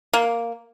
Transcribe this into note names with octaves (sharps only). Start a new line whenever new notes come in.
A#3